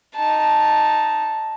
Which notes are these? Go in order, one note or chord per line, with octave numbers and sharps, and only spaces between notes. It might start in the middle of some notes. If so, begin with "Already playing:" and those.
D#4 A5